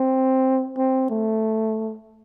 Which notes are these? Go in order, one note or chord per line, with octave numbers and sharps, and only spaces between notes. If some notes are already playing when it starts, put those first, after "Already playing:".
Already playing: C4
C4
A3